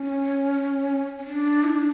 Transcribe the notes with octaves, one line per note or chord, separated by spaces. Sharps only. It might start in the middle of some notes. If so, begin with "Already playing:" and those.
Already playing: C#4
C#4
D4
E4
D4